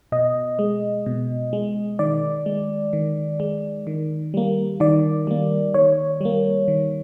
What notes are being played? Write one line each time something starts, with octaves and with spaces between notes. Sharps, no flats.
B2 D#5
G#3
B2
G#3
D#3 D5
G#3
D#3
G#3
D#3
G3 A#3
D#3 D5
G3 A#3
D#3 C#5
G3 A#3
D#3